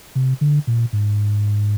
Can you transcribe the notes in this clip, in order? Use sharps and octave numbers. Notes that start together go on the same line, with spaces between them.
C3
D3
A#2
G#2